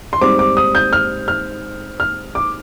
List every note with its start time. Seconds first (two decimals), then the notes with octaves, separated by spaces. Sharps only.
0.13 C6
0.21 G#2 G3 C4 D6
0.39 D6
0.57 D#6
0.75 G6
0.93 F6
1.28 F6
2.00 F6
2.35 D6